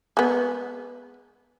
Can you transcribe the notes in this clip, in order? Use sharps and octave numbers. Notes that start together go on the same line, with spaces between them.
G#3 B3